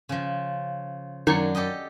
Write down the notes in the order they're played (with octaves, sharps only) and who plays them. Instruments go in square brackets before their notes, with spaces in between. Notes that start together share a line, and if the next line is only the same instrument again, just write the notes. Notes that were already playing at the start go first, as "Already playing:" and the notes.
[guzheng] C#3 F3
[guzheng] F#2 F#3 D4 [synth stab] D#3 G#6 C#7
[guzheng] G4 A4 D#5